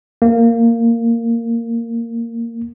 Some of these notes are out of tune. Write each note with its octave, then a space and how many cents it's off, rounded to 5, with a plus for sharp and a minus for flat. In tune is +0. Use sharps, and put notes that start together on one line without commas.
A#3 -15